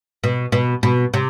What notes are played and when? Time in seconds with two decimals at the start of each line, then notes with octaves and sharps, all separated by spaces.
0.24 B2
0.52 B2
0.83 B2
1.14 C3